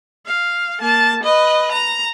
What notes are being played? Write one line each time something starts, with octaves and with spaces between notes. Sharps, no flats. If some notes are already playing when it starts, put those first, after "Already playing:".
F5
A#3 A5
B4 D#5
A#5